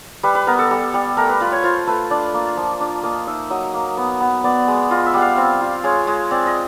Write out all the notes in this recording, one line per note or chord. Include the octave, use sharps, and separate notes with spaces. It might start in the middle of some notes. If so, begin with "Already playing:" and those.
G3 B4
B4
B3 A#4
A4
G3
G3
A3 A#4
B4
F4 B4
C#5
F4 C5
A3 B4
D4 D5
A#3
F3
D4
A#3 D#5
D#4 E5
F#3 D#5
A#3
B3
B3
B3 D5
G#3
F4 D#5
E5
G3 F#5
F5
C4
F4
G#3 C#5
G#3
C4 D5
D#5